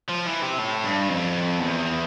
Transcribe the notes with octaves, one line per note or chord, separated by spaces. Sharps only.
F3
E3
C3
A2
G2
F2
E2